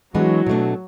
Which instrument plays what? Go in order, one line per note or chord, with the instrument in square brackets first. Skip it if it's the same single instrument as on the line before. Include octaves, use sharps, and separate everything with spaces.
[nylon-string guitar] E3 G#3 B3 D4 [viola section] F#3
[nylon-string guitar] B2 A3 D4